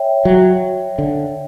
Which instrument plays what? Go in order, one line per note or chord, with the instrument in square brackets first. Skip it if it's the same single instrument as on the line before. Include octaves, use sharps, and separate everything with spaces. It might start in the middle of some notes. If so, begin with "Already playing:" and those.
Already playing: [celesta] C#5 E5 G5
[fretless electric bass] F#3
D3